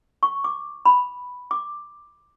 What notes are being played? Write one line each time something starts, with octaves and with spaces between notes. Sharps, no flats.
C#6
D6
B5
D6